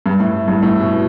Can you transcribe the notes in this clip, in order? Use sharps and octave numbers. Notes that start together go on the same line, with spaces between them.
G2
A2
G2
A2
B2